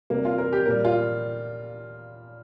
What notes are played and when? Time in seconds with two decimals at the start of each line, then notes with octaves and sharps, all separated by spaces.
0.10 C3 G3 A#3
0.25 F4
0.38 A#4
0.53 G4
0.66 A#2 G3 A#4
0.85 F4